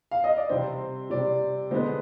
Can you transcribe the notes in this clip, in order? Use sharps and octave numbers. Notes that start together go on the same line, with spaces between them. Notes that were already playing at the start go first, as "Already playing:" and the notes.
F5
D#5
D5
C3 G3 C4 C5
C3 G3 C4 D5
D3 G#3 B3 C5